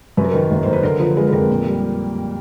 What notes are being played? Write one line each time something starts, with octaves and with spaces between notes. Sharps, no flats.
F#2 B4
A#4
D#3 B4
F#1
F#1 C5
B4
D3 A#4
F3 B4
G#3 B4
B4
F2 A#4
A#2
G3